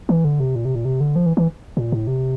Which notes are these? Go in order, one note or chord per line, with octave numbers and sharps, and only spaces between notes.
E3
D3
C3
A#2
C3
A#2
C3
D3
F3
E3
E3
A#2
A2
C3